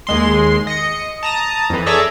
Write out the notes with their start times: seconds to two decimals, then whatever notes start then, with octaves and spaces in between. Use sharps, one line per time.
0.07 D#2 G#3 C6
0.67 D#5 C#7
1.23 A5 A#5 D#6
1.70 F2 E3
1.86 G#4 A4 C#5 D5 E5 A#5